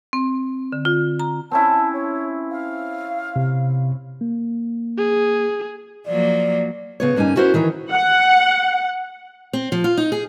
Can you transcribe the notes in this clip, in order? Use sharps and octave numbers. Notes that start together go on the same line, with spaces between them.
C4
D3
F4
A#5
C4 C#4 E4 A5
C#5
F5
C3
A#3
G#4
F3 F#3 A#3 D5
C#3 B3 C#5
G2 A#3 C#4 D#4 G#5
C#4 E4 F#4 A#4 C5
D#3 E3 A#4 C#5
F#5
C4
F3
F4
D#4
G#4